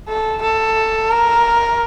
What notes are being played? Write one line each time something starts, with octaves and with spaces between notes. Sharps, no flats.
A4
A4
A#4